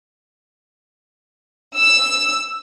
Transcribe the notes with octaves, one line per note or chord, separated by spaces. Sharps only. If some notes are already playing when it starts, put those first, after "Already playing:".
E6